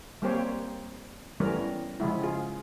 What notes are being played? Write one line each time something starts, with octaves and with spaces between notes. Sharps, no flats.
G3 A#3 C4 G4 C5 C#5
E3 G3 A3 B3 C#4 A#4
C#3 F3 G#3 E4
F4 G#4